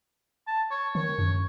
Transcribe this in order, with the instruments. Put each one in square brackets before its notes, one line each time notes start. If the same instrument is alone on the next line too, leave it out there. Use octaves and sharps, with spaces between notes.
[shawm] A5
C#5
[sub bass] D#3 [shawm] C#5
[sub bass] F#2